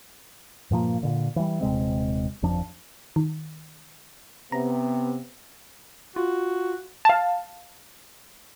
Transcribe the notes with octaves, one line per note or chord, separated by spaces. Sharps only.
G2 A#2 F3 A#3
A#2 D3
E3 G3
D#1 C3 G#3 C4
G1 F2 F3 D4
D#3
C3 B3 A#5
F4 F#4
F5 A5